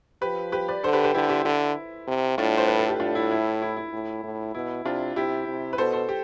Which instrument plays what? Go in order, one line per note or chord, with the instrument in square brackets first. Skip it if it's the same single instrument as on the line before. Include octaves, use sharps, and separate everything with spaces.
[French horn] F3 [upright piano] G4 B4
[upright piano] G4 B4
B4 D5
[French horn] D3 [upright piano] A4 C5
[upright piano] G4 B4
G4 B4
[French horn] D3 [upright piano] E4 G4
[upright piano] E4 G4
[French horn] D3 [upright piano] E4
[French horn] C3
[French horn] A2 [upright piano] D4 F4
[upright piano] C5
B4
A4
G4
[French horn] A2 [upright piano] D4 F4
[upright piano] E4
E4
E4
E4
[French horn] A2
A2
[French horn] B2 [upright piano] E4
[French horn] C3 [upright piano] D4 F4
[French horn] C3 [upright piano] E4 G4
[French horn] C3
[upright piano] B4
[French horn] B2 [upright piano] A4 C5
[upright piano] A4 C5
G4